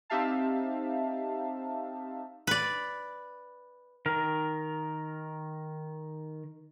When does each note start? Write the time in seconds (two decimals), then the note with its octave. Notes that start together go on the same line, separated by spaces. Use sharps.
0.10 C4 D#4 G4 E5 F5 A5
2.47 B4 D5
4.06 D#3 A#4